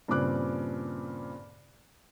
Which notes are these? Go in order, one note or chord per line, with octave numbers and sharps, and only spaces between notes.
G2 A#2 C#3 C4 D6 F#6